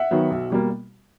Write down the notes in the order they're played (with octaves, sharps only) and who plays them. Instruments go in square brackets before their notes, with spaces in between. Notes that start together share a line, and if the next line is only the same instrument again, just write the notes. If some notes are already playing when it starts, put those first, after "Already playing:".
Already playing: [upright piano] E5 F#5
D#3 F#3 B3
B1
B2 G3 A#3